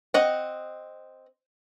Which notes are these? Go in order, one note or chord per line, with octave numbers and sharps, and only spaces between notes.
C4 D#5 F#5